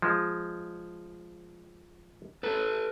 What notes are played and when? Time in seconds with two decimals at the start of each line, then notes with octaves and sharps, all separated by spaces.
0.02 F3 G#3
2.43 A4 B4